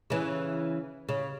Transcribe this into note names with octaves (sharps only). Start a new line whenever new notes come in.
C#3 E3
C#3